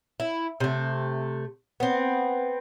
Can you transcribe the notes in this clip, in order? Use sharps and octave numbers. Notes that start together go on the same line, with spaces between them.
E4
C3 A3
B3 C4